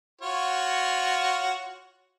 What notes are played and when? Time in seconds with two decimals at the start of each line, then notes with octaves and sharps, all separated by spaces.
0.21 F4 F#4 C#5